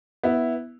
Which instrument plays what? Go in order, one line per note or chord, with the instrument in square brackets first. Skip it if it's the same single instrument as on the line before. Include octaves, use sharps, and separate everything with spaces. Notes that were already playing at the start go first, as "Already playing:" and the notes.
[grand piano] B3 E4